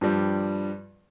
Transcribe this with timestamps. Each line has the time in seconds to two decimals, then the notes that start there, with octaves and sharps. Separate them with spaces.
0.01 G2 F3 G3